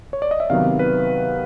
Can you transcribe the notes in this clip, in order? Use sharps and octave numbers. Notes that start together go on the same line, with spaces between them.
C#5
D5
D#5
E5
C3 D#3 F#3 B3 F5
B4